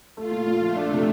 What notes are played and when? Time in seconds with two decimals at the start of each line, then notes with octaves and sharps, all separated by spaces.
0.17 A3 F4
0.31 A#2
0.47 A#2
0.61 F3 A3
0.76 D4
0.91 C3